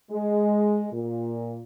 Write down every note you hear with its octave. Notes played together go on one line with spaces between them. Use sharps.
G#3
A#2